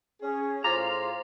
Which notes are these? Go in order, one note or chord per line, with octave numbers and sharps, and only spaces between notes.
C#4 G#4
A2 F4 G#4 C5 F5 A#5 D6 A6